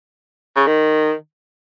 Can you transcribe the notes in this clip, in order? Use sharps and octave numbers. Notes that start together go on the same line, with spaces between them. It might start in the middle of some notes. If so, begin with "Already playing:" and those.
C#3
D#3